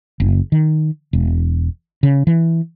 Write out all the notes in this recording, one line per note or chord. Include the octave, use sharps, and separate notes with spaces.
F#1
D#3
E1
C#3
E3